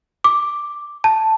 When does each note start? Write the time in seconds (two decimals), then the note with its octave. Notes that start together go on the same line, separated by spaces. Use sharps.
0.24 D6
1.04 A5